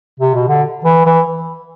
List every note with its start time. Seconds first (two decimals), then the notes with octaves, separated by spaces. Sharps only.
0.20 C3
0.34 B2
0.48 D3
0.84 E3
1.05 E3